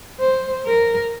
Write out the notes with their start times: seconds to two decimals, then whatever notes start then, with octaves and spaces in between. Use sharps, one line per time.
0.20 C5
0.66 A#4